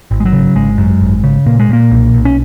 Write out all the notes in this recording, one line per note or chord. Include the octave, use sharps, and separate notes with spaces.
G#1
G#3
F#3
C#3
G#1 G#3
F#2
G#1
C#3
A#2 A#3
G#3
A#2 A#3
B1
B1
C#4